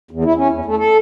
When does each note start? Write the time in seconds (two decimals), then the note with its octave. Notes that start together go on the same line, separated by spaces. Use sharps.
0.11 E2
0.25 E4
0.37 C#4
0.52 E2
0.65 A3
0.78 A4